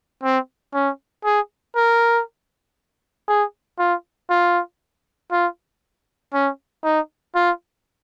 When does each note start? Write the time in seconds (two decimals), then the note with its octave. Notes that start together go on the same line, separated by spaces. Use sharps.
0.23 C4
0.74 C#4
1.25 G#4
1.76 A#4
3.28 G#4
3.78 F4
4.30 F4
5.31 F4
6.33 C#4
6.84 D#4
7.35 F4